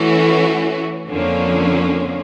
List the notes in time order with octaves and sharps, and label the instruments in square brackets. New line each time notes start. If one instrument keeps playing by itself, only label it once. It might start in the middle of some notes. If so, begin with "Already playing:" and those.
Already playing: [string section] E3 A3 C#4 F#4
F2 D3 F3 A#3 C#4